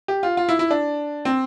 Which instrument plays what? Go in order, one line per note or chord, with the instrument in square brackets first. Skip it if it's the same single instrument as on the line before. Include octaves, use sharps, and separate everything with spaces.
[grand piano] G4
F4
F4
E4
E4
D4
C4